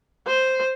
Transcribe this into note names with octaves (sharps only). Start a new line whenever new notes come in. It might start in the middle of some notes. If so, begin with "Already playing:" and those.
C5